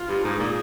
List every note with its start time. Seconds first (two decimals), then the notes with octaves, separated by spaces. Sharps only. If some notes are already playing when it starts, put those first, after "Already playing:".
Already playing: F4
0.09 G2
0.24 G#2 G#4
0.40 A#2